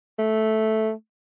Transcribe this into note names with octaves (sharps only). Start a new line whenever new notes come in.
A3